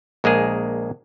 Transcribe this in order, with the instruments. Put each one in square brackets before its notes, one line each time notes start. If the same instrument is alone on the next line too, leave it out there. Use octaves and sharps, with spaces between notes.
[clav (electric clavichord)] A#1 G#3 A#3 G#4